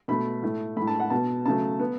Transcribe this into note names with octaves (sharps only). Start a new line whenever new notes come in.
B2 A3 B5
A2 A3
A2 A3 B5
A5
F#5
B2 B3 A5
C#3 F#3 A3 A5
B3